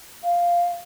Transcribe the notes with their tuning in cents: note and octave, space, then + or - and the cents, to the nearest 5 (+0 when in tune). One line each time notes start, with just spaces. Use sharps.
F5 +0